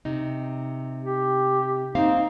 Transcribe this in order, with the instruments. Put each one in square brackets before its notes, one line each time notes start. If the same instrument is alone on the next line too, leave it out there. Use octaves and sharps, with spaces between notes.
[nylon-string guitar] C3 D#4
[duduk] G4
[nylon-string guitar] A#3 C4 F5 [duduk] D#4